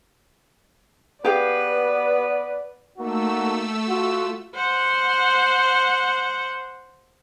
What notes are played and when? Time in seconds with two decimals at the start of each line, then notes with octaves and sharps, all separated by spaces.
1.24 B3 G4 G#4 B4 D5 F5
2.97 A3 A#3 D#4 F#4 E6
3.87 F4 F#4
4.55 C5 F#5